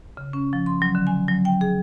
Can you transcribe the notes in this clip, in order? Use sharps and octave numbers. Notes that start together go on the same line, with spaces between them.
C#3
C#4
F3
C6
F#3
D3
G#5
F#3
G5
G#4